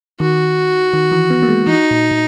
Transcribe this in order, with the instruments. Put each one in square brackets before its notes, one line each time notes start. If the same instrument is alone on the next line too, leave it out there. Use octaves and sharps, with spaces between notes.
[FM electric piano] D#3 [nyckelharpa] F#4
[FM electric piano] D#3
E3
B3
A#3
G#3
[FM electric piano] E3 [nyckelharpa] D#4
[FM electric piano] A#2
A#2